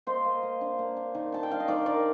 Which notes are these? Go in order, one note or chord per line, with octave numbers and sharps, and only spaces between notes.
A#3 C5 D#5
A#3
A#3
D4
A#3
D4
D#3
D4 A5
G5
D4 F5
D#5
D#3 A#4 D5
D4 A#4 D5